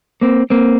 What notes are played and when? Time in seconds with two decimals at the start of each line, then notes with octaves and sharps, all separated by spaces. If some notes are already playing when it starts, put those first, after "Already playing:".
0.21 A#3 C4
0.50 A#3 C4